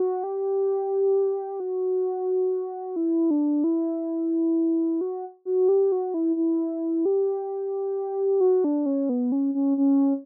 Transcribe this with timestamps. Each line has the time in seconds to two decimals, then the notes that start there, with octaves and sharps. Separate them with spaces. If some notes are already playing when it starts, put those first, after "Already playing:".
Already playing: F#4
0.24 G4
1.60 F#4
2.96 E4
3.31 D4
3.64 E4
5.01 F#4
5.45 F#4
5.69 G4
5.92 F#4
6.14 E4
6.36 E4
7.05 G4
8.40 F#4
8.64 D4
8.86 C#4
9.09 B3
9.32 C#4
9.55 C#4
9.78 C#4